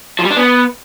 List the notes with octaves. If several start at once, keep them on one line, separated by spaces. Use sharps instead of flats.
F3
G3
D4
B3